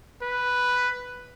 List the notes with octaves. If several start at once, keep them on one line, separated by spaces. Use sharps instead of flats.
B4